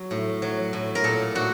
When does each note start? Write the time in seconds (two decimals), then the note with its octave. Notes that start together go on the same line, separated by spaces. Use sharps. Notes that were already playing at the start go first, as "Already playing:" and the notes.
Already playing: F#3
0.11 A2
0.42 F#3
0.73 A2
0.95 A#4
1.04 A#2 A4
1.35 A#2 F#4